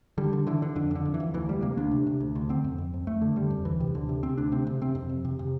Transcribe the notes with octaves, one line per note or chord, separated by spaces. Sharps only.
D3 G3
D3
D3 E3
D3
F2 D3
F2 D3
F2
E3
F2
D2 E3
D2 G3
C3 A#3
D2 D4
C3
C3
D2
D2
D3 C4
F2
F2
F2
F2 A3
D3
D3 G3
F2
D2 E3
C3
D2 D3
C3
C3 C4
D2 D4
C3 C4
C3
C3 C4
F2
F2
C3
C3